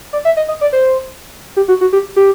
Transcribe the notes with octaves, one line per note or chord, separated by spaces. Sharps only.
D5
E5
D#5
D#5
D5
C5
G4
F#4
F#4
G4
G4